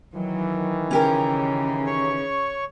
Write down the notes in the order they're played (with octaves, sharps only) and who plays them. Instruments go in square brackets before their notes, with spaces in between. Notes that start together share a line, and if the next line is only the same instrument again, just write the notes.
[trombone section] D#3 E3 [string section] F#3
[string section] C#3 [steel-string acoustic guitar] C#4 G4 A#4
[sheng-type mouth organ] C#5 C#6